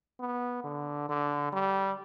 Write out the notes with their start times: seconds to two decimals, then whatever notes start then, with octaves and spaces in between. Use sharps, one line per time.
0.20 B3
0.64 D3
1.09 D3
1.52 G3